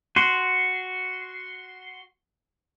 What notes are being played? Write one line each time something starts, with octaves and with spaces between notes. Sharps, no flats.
F#4 C6